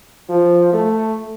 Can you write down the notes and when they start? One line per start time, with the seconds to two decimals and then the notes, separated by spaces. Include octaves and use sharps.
0.29 F3
0.73 A3